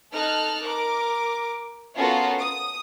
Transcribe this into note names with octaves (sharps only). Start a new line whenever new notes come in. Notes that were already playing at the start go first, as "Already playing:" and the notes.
D#4 A4 A5 F6 F#6
A#4 D6
B3 C#4 F4 F#4 A4 A#4
D#6